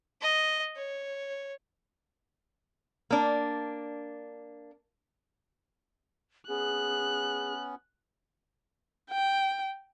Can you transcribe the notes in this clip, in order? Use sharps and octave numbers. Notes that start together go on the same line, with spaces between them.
D#5
C#5
A#3 D4
B3 C#4 G#4 F#6
G5